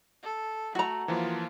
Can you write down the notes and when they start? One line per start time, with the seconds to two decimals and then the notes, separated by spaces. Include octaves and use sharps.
0.23 A4
0.75 A3 F#4 A#5
1.08 E3 F3 A#3 F4